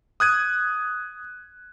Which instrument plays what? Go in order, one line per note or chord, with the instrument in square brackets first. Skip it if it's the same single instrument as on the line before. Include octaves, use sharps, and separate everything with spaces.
[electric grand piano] D#6 F#6 G#6 D#7